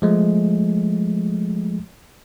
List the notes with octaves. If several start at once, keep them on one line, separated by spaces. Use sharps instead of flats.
F3 G#3 A3